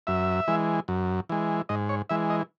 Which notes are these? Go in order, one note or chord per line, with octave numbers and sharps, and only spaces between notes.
F#2 E5
E3 G#3
F#2
E3 G#3
G#2 D#5
C#5
E3 G#3 E5
D#5